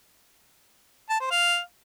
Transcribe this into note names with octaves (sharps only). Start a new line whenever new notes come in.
A5
C5
F5